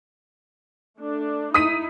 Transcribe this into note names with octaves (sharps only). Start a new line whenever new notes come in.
A3 D4
D#4 E4 D#6 B6 D#7